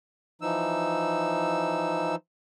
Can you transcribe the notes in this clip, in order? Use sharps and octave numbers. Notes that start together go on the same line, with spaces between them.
E3 F3 D#4 E6